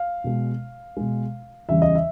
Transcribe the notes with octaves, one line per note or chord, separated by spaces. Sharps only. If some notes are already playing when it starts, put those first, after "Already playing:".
Already playing: F5
B2 G#3
B2 G#3
E2 C#3 E3 G3 E5
D#5
E5